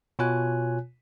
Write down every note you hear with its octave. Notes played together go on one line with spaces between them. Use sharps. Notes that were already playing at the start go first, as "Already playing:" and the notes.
B2 F4 C#5 G#5 F#6